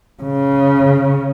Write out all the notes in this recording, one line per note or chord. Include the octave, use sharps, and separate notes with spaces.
C#3